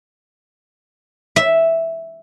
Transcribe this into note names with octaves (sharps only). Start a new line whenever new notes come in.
E5